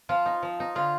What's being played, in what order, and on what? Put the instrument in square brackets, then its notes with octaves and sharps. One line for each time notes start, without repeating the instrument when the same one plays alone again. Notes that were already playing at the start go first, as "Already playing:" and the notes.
[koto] F3 F4
D#4
F3
D#4
D3 F4